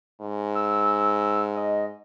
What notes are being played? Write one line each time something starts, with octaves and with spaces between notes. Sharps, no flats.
G#2
E6
D#5